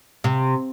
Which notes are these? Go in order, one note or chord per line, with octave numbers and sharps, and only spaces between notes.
C3